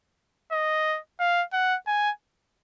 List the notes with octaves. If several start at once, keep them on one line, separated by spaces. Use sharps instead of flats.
D#5
F5
F#5
G#5